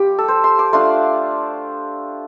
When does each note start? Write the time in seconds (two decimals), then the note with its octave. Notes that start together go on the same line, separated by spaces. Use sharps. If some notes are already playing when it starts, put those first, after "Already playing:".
Already playing: G3 F4 G4
0.18 A4
0.28 C5
0.44 C6
0.59 D6
0.73 A3 D4 F4 C6